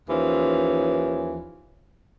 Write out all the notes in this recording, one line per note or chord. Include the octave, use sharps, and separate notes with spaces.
D#2 E3 F3 C#4